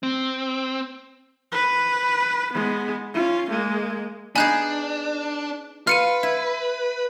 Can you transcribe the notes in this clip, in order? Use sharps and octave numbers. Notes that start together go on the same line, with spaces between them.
C4
B4
G#3 B3
C#4 F4
G#3 A#3
B3 D4 D#4 G#4 G#5 F#6
F4 B4 F6 C#7 D#7
E4